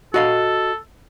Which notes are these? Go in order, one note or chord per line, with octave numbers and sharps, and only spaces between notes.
F#4 A4 D#5 F5